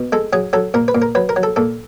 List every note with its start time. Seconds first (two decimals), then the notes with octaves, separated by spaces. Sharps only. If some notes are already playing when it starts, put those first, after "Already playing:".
Already playing: B2
0.12 G#3 A4
0.33 F#3 G#4
0.53 F#3 A4
0.74 A#2 A#4
0.88 B4
0.95 A#2
1.02 A#4
1.15 F#3 B4
1.29 A#4
1.36 F#3
1.43 A4
1.56 A#2 A4